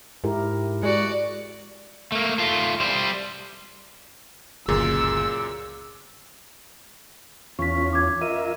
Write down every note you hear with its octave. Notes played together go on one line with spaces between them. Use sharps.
G#2 E4 G4 A#4
G#3 F#4 D5
A3 A#3
A3 F4
G3 C5
G1 C#2 F#2 A#2 G#4 E6
E2 C#4 F4 C#6 B6
D6 G#6
F4 A#4 D#5 E5 D#7